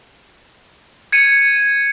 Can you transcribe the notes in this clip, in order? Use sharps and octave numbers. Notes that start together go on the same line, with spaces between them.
G#6 C#7 D#7